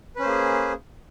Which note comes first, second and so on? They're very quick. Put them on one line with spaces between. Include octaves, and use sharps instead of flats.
B4 C#4 C5 A#3 G#4